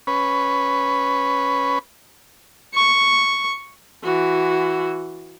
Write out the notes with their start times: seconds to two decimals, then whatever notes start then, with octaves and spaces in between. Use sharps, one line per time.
0.07 C#4 B4
2.74 C#6
4.04 E3 F#4